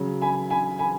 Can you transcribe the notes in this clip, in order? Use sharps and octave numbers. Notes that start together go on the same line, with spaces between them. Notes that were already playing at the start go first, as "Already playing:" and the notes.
Already playing: C#3 F#3
G#5 B5
G#5 B5
G#5 B5